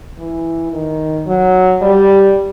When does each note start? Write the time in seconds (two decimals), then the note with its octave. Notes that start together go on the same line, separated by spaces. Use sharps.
0.19 E3
0.72 D#3
1.26 F#3
1.82 G3